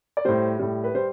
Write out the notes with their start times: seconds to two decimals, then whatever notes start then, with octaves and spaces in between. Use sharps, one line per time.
0.17 D5
0.25 A2 G3 C5
0.59 A2 G3
0.84 B4
0.94 G3 C5